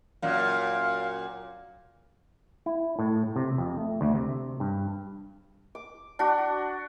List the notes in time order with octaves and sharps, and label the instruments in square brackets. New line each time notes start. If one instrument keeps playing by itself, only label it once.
[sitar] F#2 A#2 [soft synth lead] F5
[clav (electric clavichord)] E4
A2
C3
F2
A3
D2
C3
G2
[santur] D6
D4 F#4